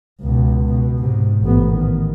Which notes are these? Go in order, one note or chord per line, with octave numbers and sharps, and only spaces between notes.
C#2 B2
B2
G#2 C3
A1 B3
D#3